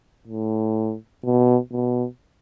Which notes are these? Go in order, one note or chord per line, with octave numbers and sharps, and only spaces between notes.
A2
B2
B2